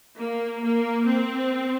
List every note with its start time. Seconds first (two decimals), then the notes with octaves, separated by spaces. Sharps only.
0.17 A#3
0.62 A#3
1.06 C4